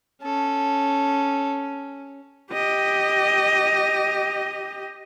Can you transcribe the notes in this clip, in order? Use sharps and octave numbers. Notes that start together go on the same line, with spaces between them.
C#4 A4
G4 D#5